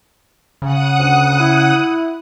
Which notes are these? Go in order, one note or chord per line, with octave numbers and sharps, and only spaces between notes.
C#3 F#5 D#6 F#6
D2
E4